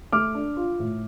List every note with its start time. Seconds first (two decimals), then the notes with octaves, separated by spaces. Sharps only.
0.12 A3 D6 F6
0.35 D4
0.57 F4
0.80 A2